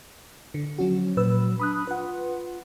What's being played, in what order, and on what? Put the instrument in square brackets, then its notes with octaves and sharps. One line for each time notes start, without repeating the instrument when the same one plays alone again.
[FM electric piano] D3
[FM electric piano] F3 C#4 F#4 [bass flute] F#3
[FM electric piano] A#2 B4 E6
[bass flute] D4 [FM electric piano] B5 D#6 F#6
[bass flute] F4 [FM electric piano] B4 F#5